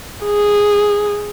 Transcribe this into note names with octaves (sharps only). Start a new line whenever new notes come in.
G#4